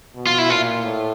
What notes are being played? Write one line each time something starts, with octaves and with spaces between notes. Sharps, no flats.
B2
F4
E4
A#2 F4
A2